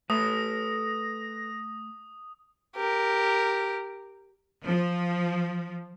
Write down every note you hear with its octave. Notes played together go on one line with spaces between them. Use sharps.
A3 A4 B4 D#6 A#6
G4 A#4
F3